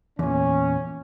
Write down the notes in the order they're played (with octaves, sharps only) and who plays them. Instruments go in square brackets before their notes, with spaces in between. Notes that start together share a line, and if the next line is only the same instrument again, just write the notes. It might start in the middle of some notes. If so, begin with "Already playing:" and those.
[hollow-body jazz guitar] E2 A#2 [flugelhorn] C#4